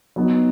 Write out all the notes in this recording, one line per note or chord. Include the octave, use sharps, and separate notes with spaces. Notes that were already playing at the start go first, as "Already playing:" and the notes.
F#3 B3 D#4 F#4